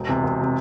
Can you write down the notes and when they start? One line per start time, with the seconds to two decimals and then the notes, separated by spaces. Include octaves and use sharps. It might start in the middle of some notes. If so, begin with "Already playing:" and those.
Already playing: E1
0.09 E2 C3
0.24 E1
0.41 C3